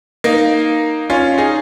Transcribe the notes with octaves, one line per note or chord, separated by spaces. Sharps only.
A#3 D#4
C#4 F4
D#4 G#4